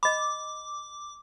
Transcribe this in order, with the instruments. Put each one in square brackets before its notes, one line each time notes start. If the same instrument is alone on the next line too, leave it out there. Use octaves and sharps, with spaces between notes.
[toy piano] D#5 B5 [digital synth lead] D6